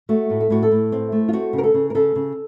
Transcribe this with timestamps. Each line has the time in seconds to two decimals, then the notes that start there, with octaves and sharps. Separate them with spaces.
0.09 A3 F#4
0.30 A2
0.40 A4
0.50 A2 F#4
0.63 A4
0.72 A2
0.92 C4
1.12 A3
1.28 F4
1.33 C4 F#4
1.53 C#3
1.58 A#4
1.64 A4
1.74 C#3
1.90 A#4
1.95 C#3 A4
2.16 C#3